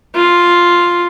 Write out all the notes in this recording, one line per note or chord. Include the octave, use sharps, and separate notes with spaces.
F4